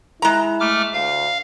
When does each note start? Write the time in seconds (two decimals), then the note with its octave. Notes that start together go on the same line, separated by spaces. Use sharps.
0.22 G#3 E4 A#5
0.60 A3 D6 F6
0.93 D2 F5